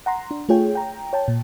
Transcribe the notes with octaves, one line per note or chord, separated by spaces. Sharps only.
F#5 A#5 C6
D4
A3 F4 G#4 C#5 G5
G5 A#5
C#5 G5 A5
A#2